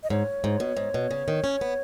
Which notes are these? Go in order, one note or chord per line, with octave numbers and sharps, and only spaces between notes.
D#5
G#2 C#5
G#2
B2
G#2
B2
C#3
D#3
C#4
B3